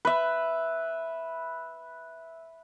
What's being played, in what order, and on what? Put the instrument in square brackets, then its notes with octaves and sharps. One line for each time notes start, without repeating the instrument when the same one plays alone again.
[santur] B4 E5